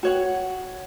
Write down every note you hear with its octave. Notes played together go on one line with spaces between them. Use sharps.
F#4 C#5 F#5